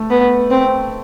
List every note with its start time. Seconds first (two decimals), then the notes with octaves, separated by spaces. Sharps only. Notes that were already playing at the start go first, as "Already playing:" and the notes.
Already playing: A3
0.10 B3
0.51 C4